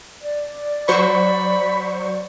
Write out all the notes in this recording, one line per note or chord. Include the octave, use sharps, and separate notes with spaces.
D5
F#3 C5 B5 C#6